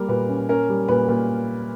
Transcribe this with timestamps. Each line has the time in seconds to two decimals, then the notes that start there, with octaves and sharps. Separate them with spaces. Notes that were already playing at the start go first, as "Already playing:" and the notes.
Already playing: G3 A#3 A#4
0.09 A#2 B4
0.29 C#4
0.49 C#4 A#4
0.69 G3
0.88 A#2 B4
1.09 A#2